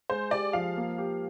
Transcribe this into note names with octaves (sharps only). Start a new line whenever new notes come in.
G#3 C5
G4 D5
F3 F5
A#3
G4